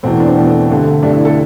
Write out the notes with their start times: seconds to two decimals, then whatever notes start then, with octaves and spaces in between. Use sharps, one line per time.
0.03 E2 B2 A3 C4
0.20 D4
0.28 C4
0.36 E2 B2 A3
0.44 C4
0.70 G2 D3 A3
1.02 G2 D3 A3 D4
1.14 E4
1.25 A4